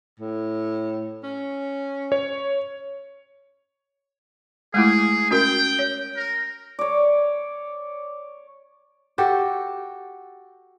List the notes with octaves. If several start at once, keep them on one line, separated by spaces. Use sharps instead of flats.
A2
C#4
C#5
G#3 A3 E4 G#4
C#4 F#4 A#4 G5
C#5
A#4
C#5 D5
F#4 G4 A4